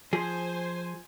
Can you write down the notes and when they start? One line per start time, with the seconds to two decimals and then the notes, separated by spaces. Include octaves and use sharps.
0.13 F3 G#4 C5 G#5